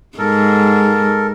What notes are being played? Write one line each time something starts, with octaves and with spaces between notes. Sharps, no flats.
G#2 A4 A#4